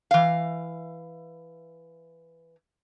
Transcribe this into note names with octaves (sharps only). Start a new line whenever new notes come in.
E3 F5